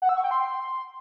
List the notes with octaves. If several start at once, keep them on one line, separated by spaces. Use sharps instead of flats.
F#5
E6
C#6
G5
C6